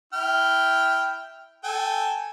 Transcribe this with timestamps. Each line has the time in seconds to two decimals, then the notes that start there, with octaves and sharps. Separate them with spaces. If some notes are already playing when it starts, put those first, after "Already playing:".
0.13 E4 G5 F6
1.64 A4 G5 G#5